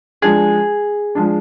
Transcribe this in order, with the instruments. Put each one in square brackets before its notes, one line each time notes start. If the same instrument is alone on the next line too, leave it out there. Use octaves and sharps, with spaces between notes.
[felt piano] F3 G#3 D4 [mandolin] G#4
[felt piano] F3 G#3 D4